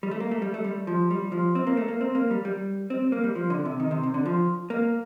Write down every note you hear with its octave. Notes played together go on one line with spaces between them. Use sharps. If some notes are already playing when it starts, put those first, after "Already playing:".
G3
A3
A#3
A3
G3
A3
G3
F3
G3
F3
C4
A#3
A3
A#3
C4
A#3
G3
G3
C4
A#3
G3
F3
D3
C3
D#3
C3
C3
D3
F3
A#3